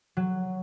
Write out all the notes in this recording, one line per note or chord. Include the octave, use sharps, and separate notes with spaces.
F#3